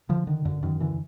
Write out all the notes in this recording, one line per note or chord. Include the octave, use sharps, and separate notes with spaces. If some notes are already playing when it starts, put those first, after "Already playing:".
D3 F3
D3 D#3
F#2 D3
F#2 D#3
D3 E3